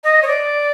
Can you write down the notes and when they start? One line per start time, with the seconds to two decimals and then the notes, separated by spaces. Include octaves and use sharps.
0.04 D#5
0.22 C#5
0.27 D5